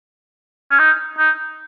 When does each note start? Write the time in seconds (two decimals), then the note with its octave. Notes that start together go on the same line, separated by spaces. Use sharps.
0.71 C#4
0.79 D#4
1.18 D#4